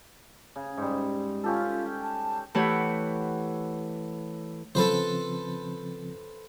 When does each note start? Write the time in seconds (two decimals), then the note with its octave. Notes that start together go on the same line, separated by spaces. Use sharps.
0.56 C#3
0.77 G#2 G3
1.44 C#4 F4 G4 A4
1.86 G5
2.03 A5
2.55 E3 A3 E4 G4 C#5 F#5
4.75 C#3 F3 C4 A4 B4 C5